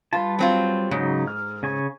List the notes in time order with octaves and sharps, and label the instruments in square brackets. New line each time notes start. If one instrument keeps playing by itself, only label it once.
[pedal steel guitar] G3 B4 A5 [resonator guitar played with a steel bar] F4
[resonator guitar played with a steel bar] F#3 C4 F4
[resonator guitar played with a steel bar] G#2 [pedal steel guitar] C#3 F#3 D#4
[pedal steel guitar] F6
C#3 G#5 C#6